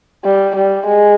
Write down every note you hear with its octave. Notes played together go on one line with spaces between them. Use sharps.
G3
G3
G#3